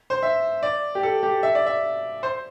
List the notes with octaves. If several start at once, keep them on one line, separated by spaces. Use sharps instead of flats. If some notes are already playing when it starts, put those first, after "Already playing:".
C5
E5
D5
G4
A4
G4
E5
D5
E5
C5